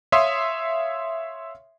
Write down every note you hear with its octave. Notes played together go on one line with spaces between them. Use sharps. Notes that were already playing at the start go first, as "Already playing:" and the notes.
C#5 E5 F5 C6 D#6